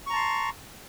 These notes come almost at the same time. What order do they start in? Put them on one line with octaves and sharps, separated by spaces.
C#6 A#5 A5 C6